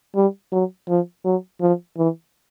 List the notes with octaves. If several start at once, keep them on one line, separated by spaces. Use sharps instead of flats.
G3
F#3
F3
F#3
F3
E3